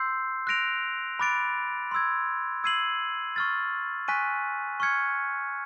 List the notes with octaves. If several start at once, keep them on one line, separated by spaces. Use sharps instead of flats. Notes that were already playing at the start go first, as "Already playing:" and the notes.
Already playing: C6 E6 G6 C7
F#6 A#6 D7 F7
B5 D6 F#6 A6 D7
C6 E6 G#6
E6 G#6 C7 D#7 F#7
C#6 F6 A6
G#5 C#6 F#6 B6 D#7
C#6 F6 G#6 C#7